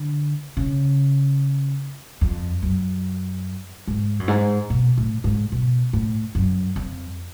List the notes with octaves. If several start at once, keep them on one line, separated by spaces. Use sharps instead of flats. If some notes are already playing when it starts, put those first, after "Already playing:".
Already playing: D3
C#3
F2
F#2
G#2
F#2
G#2
B2
A2
G#2
B2
A2
F#2
F2